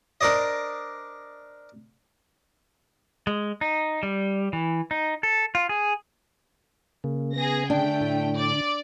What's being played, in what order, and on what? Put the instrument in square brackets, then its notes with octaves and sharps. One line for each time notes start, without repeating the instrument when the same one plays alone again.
[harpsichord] D4 A#4 C5 D5 D#5
[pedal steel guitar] G#3
D#4
G3
E3
D#4
A4
F4
G#4
[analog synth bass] C#3 [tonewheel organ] A#3
[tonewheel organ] B3 [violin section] G#4 A#6
[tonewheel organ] D3 [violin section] A3 G5 [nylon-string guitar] D4
[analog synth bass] A2
[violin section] D5